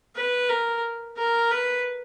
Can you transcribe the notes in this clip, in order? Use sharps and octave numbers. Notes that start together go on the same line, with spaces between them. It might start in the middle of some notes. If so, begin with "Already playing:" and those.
B4
A#4
A#4
B4